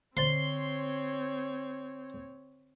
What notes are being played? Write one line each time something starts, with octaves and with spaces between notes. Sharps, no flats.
D3 C4 C5 C#5 C6 A6